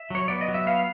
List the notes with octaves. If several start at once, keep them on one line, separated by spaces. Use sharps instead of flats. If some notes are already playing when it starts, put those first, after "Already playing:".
Already playing: E5
F#3 C#5
B3 D5
D#5
F#3
E5
B3 F5